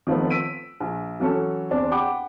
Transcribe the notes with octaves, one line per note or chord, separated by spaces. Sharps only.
D#3 F3 A3 B3 C4
E6 B6 D7 D#7
A#1
E3 F#3 C#4 A4
E2 C4 D4
F#5 G5 B5 D6